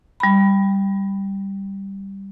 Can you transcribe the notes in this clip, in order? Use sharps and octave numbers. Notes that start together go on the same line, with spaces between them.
G3 B5